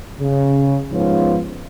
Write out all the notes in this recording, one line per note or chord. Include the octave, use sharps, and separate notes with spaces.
C#3
G#2 F3 B3 C#4 F4